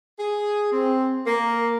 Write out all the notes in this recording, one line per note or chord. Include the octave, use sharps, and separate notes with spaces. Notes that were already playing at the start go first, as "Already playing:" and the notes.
G#4
C4
A#3